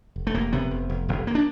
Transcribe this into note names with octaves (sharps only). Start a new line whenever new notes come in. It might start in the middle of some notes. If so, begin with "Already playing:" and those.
F1
A3
F1 A#3
C3 B3
F1
F1
F1
A#3
D4